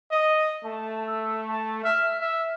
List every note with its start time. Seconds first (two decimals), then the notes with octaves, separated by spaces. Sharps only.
0.11 D#5
0.65 A3 A5
1.07 E6
1.48 A5
1.84 E5 F6
2.21 E5 F6